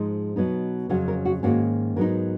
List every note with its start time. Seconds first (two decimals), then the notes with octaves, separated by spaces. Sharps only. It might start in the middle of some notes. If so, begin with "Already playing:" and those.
Already playing: G#2 F3 G#3 D#4
0.36 B2 F#3 B3 D#4
0.89 F2 C#3 F#3 C#4 F#4
1.08 A#4
1.25 F#4
1.43 G#2 D#3 A#3 C#4 F#4
1.96 G#2 F#3 B3 D#4 A#4